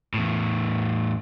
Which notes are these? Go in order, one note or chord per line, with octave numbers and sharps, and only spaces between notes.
E2 A2